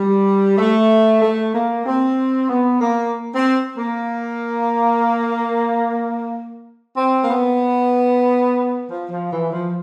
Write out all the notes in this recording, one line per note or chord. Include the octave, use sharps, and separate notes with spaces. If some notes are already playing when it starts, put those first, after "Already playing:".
Already playing: G3
A3
A3
A#3
C4
B3
A#3
C4
A#3
C4
A#3
B3
F3
F3
E3
F3